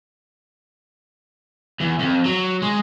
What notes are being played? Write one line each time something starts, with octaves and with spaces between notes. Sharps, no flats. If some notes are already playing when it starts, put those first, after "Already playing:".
E2
F2
F#3
G#3